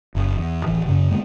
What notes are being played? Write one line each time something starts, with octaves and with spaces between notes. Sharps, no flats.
F#1
E2
D1 A1 E3
F#2 C#3
D3 G#3 A#3 B3